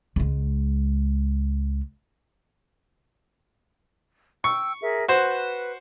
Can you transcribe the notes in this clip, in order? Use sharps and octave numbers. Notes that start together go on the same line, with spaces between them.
C#2 G#3
G5 C#6 E6
G#4 A#4 E5
F#4 B4 C5